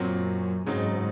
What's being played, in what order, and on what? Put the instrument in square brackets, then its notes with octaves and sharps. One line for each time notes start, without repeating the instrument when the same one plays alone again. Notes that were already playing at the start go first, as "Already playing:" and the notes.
Already playing: [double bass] F#2 [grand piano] A#2 F#3 C4
[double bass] G#2 [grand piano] C#3 F#3 C4 D#4